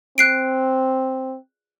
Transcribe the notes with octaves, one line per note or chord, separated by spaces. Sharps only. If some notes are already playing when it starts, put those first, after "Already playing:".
C4 F#6 C7 D7